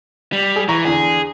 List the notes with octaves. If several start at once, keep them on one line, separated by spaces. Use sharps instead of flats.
G3
G#4
E3 A#5 C#6 A#6
E2 D3 G#4